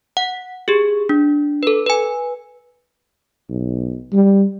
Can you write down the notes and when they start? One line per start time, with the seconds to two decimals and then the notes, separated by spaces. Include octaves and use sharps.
0.17 F#5
0.68 G4 G#4
1.09 D4
1.63 A4 B4
1.86 B4 G#5
3.50 B1
4.13 G3